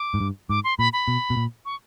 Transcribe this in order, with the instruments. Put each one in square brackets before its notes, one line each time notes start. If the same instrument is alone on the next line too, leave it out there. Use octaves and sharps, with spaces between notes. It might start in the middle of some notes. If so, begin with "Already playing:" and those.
Already playing: [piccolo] D6
[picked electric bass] G#2
G2
[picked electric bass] G#2 [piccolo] D6
[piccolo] C6
[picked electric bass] A#2 [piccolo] B5
[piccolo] B5
[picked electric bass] B2
B2
A#2
[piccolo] C#6